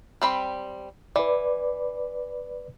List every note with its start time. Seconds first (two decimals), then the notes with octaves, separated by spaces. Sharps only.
0.22 G3 C4 B5
1.16 E3 B4 D5